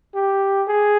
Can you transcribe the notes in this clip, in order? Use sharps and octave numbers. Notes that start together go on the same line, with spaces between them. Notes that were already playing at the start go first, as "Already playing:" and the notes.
G4
G#4